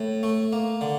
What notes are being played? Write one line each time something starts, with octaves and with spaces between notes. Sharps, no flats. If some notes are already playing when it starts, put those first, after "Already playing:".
Already playing: A2
A3
A#3
D3